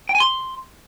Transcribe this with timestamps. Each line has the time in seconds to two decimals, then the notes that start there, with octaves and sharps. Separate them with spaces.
0.09 G5
0.15 G#5
0.20 C6